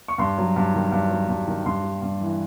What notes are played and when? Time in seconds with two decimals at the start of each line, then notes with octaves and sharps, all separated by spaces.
0.08 C#6
0.18 G2 C6
0.38 F#3
0.56 G2
0.74 D#3
0.92 G2
1.10 F#3
1.28 G2
1.47 D#3
1.65 G2 C6
1.83 G3
2.02 G2
2.21 E3